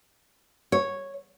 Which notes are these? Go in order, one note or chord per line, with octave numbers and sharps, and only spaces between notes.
C#5